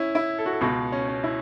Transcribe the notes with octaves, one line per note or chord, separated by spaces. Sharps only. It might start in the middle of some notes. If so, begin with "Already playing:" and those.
Already playing: C#4 E4
E4
A4
F#4
A4
C#2 B2 F#4
C#4
C#4
E4